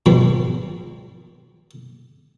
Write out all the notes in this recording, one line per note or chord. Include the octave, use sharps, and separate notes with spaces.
G#2 B2 D#3 F3